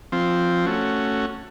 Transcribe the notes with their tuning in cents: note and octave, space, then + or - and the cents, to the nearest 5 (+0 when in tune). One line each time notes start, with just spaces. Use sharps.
F3 +0 C4 +0
A3 +10 C#4 +0 F#4 +5